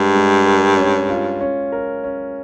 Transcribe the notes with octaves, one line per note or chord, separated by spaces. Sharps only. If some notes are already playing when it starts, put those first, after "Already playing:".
Already playing: G2 G#3 A#4
G#3
A#4
C#4
F4
C#4
A#4
C#4